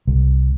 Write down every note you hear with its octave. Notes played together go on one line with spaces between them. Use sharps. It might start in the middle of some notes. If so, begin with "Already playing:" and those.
C2